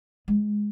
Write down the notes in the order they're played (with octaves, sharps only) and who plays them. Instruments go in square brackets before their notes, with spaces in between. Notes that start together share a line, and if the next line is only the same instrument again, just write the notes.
[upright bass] G#3